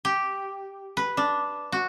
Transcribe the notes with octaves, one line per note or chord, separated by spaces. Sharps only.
G4
B4
D4
F#4